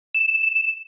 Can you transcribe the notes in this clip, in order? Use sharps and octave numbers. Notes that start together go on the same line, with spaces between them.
E7